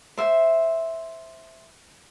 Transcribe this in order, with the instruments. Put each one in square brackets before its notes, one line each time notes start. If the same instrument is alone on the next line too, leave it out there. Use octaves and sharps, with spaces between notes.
[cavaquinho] C5 E5